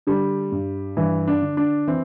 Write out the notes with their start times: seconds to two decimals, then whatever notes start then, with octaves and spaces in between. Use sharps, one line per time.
0.07 D3 G3
0.52 G2
0.97 G2 E3
1.27 D4
1.42 D3
1.57 D4
1.87 E3 C4